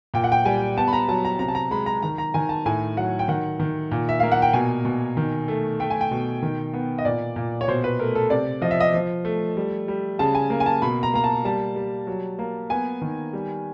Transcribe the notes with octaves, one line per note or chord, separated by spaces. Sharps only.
A#2 G5
F#5
G5
G3 G#5
B3 A5
B5
A#5
F#3 A5
A#5
C3 A#5
A5
A#5
G#3 B5
A#5
D#3 A#5
A#5
D#3 G#5
A5
A2 G#5
F#3 F#5
G5
D#3 F#5
D#3
A#2
E5
A#3 F5
F#5
G5
B2 G#5
B2
D#3
A3
A3 G5
G#5
G5
B2
D#3
B3
D#5
A#2 D5
A#2
C#5
B2 C5
B4
A3 A#4
A4
C3 D5
F3 D#5
E5
D#5
F3
A3
G3
G3
C#3 A5
G#5
A#3
G#5
A5
B2 B5
A#5
A#3 A#5
A5
G3 A5
G3
F#3
A#3
B3 G#5
D#3
G3